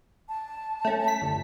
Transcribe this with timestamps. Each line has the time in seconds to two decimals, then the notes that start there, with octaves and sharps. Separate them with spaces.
0.29 A5
0.85 A3 C#4
1.08 B6
1.22 G1